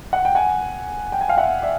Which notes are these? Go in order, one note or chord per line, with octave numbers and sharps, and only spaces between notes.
F#5
G5
F#5 G#5
G5
G#5
F5 G5
E5 F#5
D5 E5